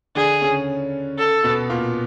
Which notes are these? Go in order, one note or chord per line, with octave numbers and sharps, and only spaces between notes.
D3 D4 G#4
C#3 C#4
A4
B2 B3
A#2 A#3